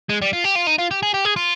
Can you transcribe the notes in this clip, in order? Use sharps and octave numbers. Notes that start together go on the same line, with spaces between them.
G#3
G3
F4
G4
F4
D#4
F4
G4
G#4
G4
G#4
F4